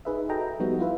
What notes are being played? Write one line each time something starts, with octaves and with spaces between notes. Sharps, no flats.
D#4 G#4 B4 D#5 E5
F#4 A4 D#5 E5 G5 A#5
F3 G3 B3 D#4 F#4
E4 F4 B4 E5